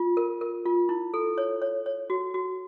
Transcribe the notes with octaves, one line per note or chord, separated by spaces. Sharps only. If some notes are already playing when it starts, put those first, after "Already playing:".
Already playing: F4
A#4
A#4
F4
E4
A4
C#5
C#5
C#5
F#4
F#4